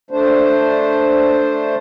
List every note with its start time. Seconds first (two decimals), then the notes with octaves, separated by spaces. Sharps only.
0.11 A3 D4 C5